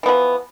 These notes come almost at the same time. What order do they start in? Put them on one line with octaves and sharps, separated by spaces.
E3 B3 F3